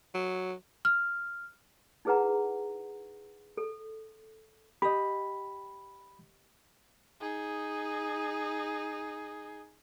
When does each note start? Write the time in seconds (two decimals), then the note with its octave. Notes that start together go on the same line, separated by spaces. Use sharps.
0.14 F#3
0.85 F6
2.05 D#4 E4 G#4 B4 F#5 A#5
3.57 A4
4.82 G4 D#5 B5
7.21 D#4 G#4